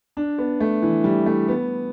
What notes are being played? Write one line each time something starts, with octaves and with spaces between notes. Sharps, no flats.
D4
B3
A3
E3
G3
A3
B3